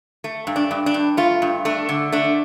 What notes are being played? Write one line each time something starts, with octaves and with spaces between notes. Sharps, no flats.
A3
G2
D4
G2
D4
G2
A3 F4
G2
A3 D4
D3
A3 D4